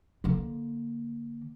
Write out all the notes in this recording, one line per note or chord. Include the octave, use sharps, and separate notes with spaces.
D3 A#3